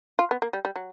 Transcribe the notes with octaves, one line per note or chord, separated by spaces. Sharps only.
F4
B3
A#3
G3
G3
F#3